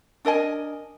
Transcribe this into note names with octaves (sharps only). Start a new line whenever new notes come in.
D4 A#4 D#5 G#5